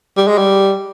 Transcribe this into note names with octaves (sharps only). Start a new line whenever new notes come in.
G3
G#3
G3